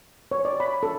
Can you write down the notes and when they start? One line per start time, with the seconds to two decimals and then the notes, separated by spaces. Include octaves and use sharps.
0.31 C#5
0.45 D5
0.60 B5
0.83 A4